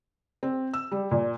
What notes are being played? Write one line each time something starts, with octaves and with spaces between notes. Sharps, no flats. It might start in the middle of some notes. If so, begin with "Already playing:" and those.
C4
E6
G3
A#2